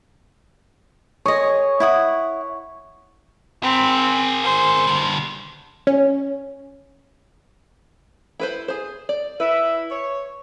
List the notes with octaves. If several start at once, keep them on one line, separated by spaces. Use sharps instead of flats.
G#4 C#5 D#5
E4 F#5 D#6
C4 G#4 A#4 B5
C5
D3 G3
C#4
E4 B4 C5
G#4 C5
D5
E4 B4 E5
C#5